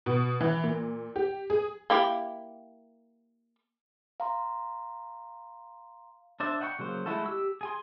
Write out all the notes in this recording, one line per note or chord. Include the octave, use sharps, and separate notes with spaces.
B2
E3
A#2
G4
G#4
A#3 E4 G4
F5 A#5 C6
D4 C5 D5 E5
D#5 F#5 G5 B5 C#6
C#3 F#3 A#3 C5
G#3 A3 E4 F#4 A4
G4 E6
G#4 G#5 C6